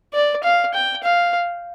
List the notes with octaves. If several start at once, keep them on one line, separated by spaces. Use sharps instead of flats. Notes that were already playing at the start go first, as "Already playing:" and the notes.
D5
F5
G5
F5